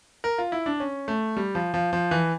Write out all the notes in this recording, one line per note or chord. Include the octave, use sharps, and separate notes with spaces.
A#4
F4
E4
D4
C#4
A3
G3
F3
F3
F3
E3